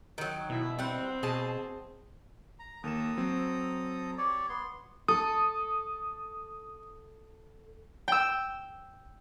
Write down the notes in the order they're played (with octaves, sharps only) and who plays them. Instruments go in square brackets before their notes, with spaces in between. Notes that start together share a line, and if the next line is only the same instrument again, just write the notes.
[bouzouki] D#3 F#3
[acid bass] B2 [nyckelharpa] E4 E5
[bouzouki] G3 F#5 [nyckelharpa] C4
[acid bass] B2 [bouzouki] G#4 A5
[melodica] A#5
[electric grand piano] D#2 A#3 E7 [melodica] A4 A#5 D#6
[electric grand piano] F#3 C4
[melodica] G4 C#5 D5
B3 C6
[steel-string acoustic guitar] A4 [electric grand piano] D#6
[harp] G5 E6